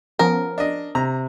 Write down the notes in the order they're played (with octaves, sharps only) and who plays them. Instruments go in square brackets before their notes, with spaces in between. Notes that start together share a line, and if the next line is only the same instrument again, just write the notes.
[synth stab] F3 B3 C#4 [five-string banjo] A#4
[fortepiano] D4 D#5
[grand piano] C3 [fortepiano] A#5